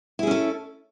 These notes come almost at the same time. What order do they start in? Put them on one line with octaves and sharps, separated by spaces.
E4 G#4 C#4 A4